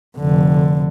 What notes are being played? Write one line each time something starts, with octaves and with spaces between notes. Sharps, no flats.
F1 D3